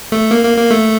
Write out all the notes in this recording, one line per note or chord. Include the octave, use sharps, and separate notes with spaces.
A3
A#3
A#3
A#3
A3